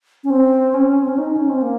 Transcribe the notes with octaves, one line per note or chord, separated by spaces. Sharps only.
C#4
C4
C#4
C4
C#4
D#4
C#4
C4
A#3